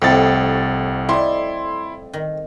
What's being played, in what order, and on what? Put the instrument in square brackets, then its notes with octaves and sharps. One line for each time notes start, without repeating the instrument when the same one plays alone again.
[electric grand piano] C2 A6 [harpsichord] F2 A2
[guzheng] G3 D#4 [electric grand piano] E4 C6
[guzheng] D#3